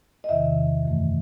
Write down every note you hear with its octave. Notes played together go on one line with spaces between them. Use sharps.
D#5
E2 C3 D#3 E5
F#2 E3 A3